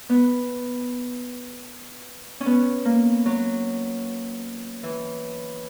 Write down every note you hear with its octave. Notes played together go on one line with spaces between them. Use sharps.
B3
C#4
B3
A#3
F#3
E3